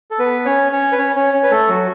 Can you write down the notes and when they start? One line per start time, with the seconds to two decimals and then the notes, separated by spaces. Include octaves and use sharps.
0.11 A4
0.19 B3 B4
0.45 C#4 C#5
0.72 C#4 C#5
0.92 B4
0.98 C#4 C#5
1.16 C#4 C#5
1.33 C#4 C#5
1.43 B4
1.51 A3 A4
1.68 F#3 F#4